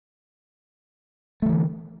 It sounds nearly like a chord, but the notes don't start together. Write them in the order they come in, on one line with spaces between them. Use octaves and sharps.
A3 F3 E3 D3